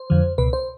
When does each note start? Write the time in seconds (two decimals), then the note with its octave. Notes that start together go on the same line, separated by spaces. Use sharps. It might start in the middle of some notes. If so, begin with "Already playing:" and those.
Already playing: C5
0.10 F2 D3 F3
0.38 C#2 B2 B4
0.53 C5